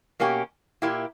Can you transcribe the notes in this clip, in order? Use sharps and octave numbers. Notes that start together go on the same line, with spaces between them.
B2 A#3 C#4 G4
A#2 A#3 E4 G4